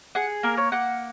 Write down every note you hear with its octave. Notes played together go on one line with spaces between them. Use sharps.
G#4 F#5
A#3 A#4
C#5
A#3 F#5